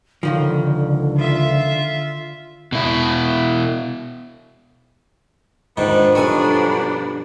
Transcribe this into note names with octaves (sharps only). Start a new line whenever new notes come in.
C#2 D3 D#3 F3
F4 E5
B2 E4
G#2 D#3 F3 B3 D4
G2 B2 F#3 A4 G#5